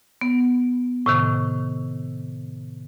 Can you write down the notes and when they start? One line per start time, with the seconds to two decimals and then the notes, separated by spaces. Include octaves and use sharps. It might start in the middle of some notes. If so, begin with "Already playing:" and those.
0.21 B3
1.06 A2 C3 D#3